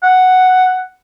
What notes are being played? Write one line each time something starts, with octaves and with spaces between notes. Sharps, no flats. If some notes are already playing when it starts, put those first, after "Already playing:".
F#5